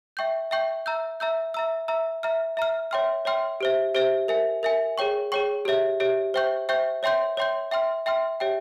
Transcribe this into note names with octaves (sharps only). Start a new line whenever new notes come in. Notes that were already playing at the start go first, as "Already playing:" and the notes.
E5 G5 C#6 G6
E5 G5 C#6 G6
E5 A#5 E6 G6
E5 A#5 E6 G6
E5 A#5 E6
E5 A#5 E6
E5 A#5 F6
E5 A#5 F6
C#5 E5 G5 C6 F6
C#5 E5 G5 C6 F6
G4 C5 E5
G4 C5 E5
A#4 E5 G#5
A#4 E5 G#5
G#4 C#5 G5 C#6
G#4 C#5 G5 C#6
G4 C#5 E5
G4 C#5 E5
C5 E5 G5 C#6 G6
C5 E5 G5 C#6 G6
C#5 E5 G5 C6 G6
C#5 E5 G5 C6 G6
E5 G5 C6 F6
E5 G5 C6 F6
G4 C#5 E5 G5